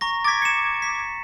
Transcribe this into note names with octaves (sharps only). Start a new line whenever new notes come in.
A#5 C#6 A#6
D6 G#6 A6 B6
C#7 E7
B6